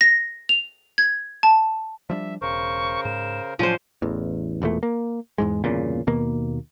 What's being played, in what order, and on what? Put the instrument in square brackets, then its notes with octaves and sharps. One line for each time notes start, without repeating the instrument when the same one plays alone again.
[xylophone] A#6
F7
G#6
A5
[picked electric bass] F3 G3 D4 [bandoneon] E5
[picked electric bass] E1 [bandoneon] C#3 A#4 C5 [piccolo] C#6
[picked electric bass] G#2 [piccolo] E7
[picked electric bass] A2 F#3 [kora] F3 C5 [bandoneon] C#4 D4 [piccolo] D#7
[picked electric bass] A1 E2
E1 E2 A#2 A3
A#3
E2 G#2 G#3
G1 E2 A#2 C#3
D#2 B2 A#3